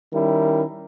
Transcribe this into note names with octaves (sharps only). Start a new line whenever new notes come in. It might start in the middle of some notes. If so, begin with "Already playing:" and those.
D#3 G3 C#4 E4 A#4